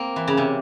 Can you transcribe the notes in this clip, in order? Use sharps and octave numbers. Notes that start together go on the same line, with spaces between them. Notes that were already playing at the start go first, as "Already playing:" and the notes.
Already playing: A#3 C4
E3
C#3
C3